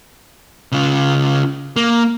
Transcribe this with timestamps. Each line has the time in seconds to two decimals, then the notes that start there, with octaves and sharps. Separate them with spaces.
0.72 C#3 F4
1.76 A#3